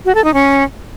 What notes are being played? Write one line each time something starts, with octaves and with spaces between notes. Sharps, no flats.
F#4
A4
D#4
C#4